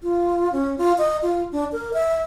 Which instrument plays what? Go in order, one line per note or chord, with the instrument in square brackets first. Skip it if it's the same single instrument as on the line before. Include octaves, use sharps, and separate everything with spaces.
[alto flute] F4
C#4
F4
D#5
F4
D4
A#4
E5